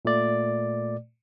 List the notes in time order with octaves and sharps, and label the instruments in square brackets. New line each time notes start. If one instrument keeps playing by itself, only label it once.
[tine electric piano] A#2 A3 D5